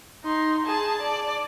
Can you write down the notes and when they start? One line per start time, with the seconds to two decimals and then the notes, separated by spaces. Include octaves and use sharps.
0.24 D#4 C6
0.65 G#4 A5
1.01 D5